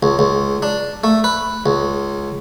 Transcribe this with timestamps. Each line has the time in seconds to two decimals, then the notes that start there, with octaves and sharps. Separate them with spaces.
0.03 C#2
0.19 C#2
0.62 D4
1.04 A3
1.24 B4
1.66 C#2